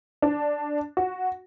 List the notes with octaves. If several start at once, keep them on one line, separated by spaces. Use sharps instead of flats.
D4
F#4